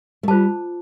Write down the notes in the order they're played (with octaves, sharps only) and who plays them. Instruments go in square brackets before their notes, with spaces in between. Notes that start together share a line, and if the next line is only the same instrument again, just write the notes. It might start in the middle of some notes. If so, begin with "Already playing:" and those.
[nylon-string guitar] A3
[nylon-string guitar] G3 [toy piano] F4 C5 A5